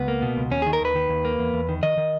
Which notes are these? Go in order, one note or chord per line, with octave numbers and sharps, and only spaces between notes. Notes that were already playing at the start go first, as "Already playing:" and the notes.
Already playing: C#2 B3
A#3
B2
C#2
D#2 C#4
D#3 G#4
A#4
D#2 B4
D#3
D#2
A#3
E2
E2
D#3
D#3 D#5
D#3